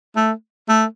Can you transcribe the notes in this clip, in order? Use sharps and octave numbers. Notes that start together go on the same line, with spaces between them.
A3
A3